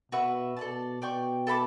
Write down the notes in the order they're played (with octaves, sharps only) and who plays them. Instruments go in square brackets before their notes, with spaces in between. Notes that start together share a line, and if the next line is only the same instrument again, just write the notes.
[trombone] B2 [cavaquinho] F#4 B4 E5
[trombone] B2 [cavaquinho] A4 D5 A5
[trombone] B2 [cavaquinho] D5 G5 C#6
[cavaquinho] A4 E5 B5 D6